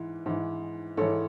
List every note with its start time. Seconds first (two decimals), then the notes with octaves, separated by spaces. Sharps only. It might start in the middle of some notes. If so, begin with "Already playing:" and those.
Already playing: G#2 E3
0.26 G#2 E3
0.97 G#2 E3 A4 C#5